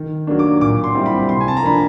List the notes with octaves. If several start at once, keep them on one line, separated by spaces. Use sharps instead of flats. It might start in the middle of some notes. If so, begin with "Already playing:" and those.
Already playing: D#3
F#3 A#3 D4
D6
A#2 D6
C6
G3 C4 E4
B5
C3 C6
G#5
A5
A#5
F3 A#3 D4 B5